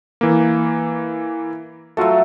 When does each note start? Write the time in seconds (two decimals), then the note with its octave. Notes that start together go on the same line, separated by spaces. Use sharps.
0.21 E3 A#3
1.97 F#3 A3 F4 F#4 A4